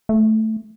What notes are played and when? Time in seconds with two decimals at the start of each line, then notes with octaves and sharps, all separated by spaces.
0.09 A3